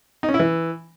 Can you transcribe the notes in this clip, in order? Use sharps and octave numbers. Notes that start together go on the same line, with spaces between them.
D#4
C#4
E4
E3